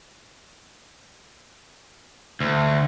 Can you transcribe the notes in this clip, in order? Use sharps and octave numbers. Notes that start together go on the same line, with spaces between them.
D2